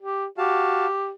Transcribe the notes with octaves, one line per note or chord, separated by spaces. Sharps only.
G4
F#4 G4 F5 A5